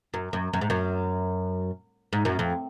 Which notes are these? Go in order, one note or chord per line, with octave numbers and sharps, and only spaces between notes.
F#2
F#2
F#2
G#2
F#2
G#2
F#2
F2